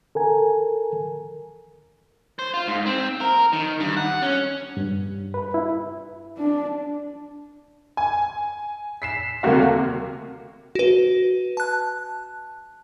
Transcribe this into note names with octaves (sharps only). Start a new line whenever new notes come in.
A4 A#4 G#5
C5
F4
G#2
C4
A#4
D#3
G2
F#5
C#4
G2
B4
E4
D4
G#5
B6 C7 E7
D#2 C3 A3 A#3 F#4 F5
F#4 B4
A5 F#6